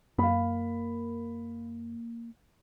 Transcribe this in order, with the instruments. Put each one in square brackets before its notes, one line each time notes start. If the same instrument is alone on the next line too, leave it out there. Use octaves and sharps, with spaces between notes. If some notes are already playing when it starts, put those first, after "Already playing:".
[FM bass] F#2 [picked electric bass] A#3 [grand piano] F5 B5